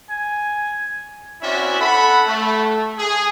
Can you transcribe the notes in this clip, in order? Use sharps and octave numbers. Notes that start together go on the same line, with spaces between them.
G#5
C4 C#4 E4 F#4 D5 E5
A4 F#5 B5
A3
G#4